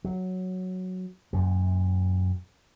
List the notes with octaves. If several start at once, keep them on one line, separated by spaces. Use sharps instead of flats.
F#3
F#2 A#2